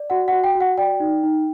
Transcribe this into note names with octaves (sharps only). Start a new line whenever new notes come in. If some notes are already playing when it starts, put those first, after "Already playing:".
Already playing: D5
F#4 F#5
F#4 F#5
G5
F#4
F#5
D5 G5
D#4
D#4